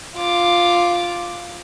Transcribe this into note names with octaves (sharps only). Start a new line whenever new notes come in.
F4 D6